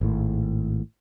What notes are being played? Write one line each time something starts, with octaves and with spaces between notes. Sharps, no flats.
G#1 A2